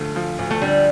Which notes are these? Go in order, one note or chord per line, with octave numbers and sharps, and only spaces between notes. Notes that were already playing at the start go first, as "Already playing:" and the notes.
Already playing: D2 D3 F3 A3
F3
D2
A3
D3 G3